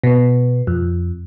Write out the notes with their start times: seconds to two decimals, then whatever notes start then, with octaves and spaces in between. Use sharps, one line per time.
0.04 B2
0.67 F2